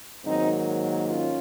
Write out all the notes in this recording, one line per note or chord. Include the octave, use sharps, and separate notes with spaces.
G#2 D#3 F#3 A#3 C4 D#4
C#4 F4